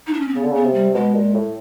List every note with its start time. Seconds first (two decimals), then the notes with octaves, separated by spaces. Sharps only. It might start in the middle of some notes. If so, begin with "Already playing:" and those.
0.07 D#4
0.13 D4
0.21 C#4
0.28 C4
0.35 C#3 B3
0.43 D3
0.51 C#3 B3
0.65 C3
0.74 G3
0.95 B2 G#3
1.14 A#2
1.34 A2